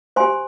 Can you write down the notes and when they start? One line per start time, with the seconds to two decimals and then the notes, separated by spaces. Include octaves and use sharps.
0.16 G4 C5 G#5 C6